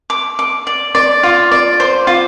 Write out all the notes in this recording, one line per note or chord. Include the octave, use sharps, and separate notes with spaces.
D6
D6
D5
D5
F4
D5
C5
F4